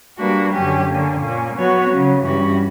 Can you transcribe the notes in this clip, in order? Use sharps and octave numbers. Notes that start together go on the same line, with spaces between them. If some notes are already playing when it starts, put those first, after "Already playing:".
G3 A#3 D4 F#4 B4
F#2 D3 F#3 C#4 G4
D3 A#3 C#4
A#2 A#3 C#4
F#3 B3 F#4 C#5
C#3 F#3 C#4
G2 E3 G3 C#4 F#4